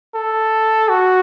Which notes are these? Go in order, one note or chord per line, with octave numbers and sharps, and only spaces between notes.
A4
F#4